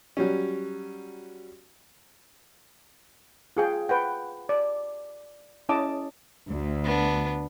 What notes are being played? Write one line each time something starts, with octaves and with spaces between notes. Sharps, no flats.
F#3 G3 C#4
F4 G#4 G5
B4 F#5 G5
D5
C#4 E4 D#5 A5 D6 D#6
D2
B3 D4